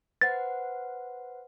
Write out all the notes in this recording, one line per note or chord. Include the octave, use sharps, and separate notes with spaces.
B4 C5 F#5 A6